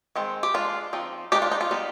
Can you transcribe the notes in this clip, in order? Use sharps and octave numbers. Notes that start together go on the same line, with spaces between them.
D#3 G#3 C4
G4
G#3 D4 F4
F3 C4 D#4
G#3 D4 D#4 G4
F4
D#4
F4
G3 B3 D#4